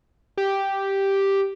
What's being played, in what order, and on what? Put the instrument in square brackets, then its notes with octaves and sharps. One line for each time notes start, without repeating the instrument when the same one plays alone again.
[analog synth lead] G4